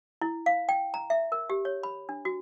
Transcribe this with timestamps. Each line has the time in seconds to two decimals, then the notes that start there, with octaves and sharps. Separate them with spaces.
0.21 E4
0.46 F5
0.69 G5
0.94 A#5
1.10 E5
1.32 A#4
1.50 G4
1.65 C#5
1.83 B5
2.09 D4
2.25 F#4